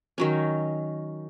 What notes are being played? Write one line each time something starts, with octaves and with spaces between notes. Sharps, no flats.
D#3 F#3 C#4